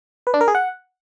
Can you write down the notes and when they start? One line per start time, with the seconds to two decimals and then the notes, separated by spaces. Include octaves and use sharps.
0.27 B4
0.34 D4
0.41 A#4
0.48 G#4
0.55 F#5